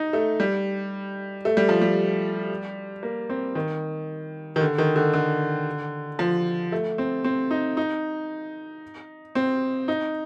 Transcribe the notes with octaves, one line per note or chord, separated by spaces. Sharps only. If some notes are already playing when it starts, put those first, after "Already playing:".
Already playing: D#4
A3
G3
A3
G3
F3
G3
A#3
C4
D#3
D#3
D3
D#3
D3
D3
F3
A3
C4
C4
D#4
D#4
C4
D#4